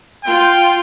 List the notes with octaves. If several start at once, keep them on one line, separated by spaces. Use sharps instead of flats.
F4 G5